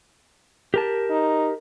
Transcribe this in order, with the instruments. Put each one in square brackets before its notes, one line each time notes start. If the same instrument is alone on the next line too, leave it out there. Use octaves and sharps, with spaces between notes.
[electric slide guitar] G4 A#4 A5
[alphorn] D#4